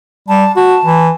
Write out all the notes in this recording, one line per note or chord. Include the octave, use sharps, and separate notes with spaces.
G3 A5
F#4 A5
E3